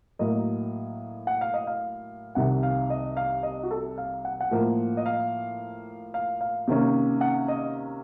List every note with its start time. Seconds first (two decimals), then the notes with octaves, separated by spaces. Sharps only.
0.19 A2 F#3 A#3 D#5
1.27 F#5
1.41 F5
1.54 D#5
1.67 F5
2.35 C2 C3 D#3 F#5
2.63 F5
2.90 D#5
3.17 F5
3.43 D#5
3.63 F#4
3.71 A4
3.98 F5
4.25 F#5
4.41 F#5
4.51 A2 F3 A#3
4.97 D#5
5.06 F5
6.14 F5
6.41 F5
6.68 C3 D#3 A#3 C#4
7.21 F#5
7.48 D#5